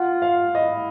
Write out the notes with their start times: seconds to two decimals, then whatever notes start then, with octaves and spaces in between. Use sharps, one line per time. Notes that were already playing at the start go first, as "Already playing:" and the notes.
Already playing: F4 F#5
0.22 F5
0.54 E4 D#5